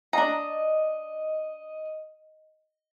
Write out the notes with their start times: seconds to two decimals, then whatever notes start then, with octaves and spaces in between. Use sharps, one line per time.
0.13 D4 D#5 A#5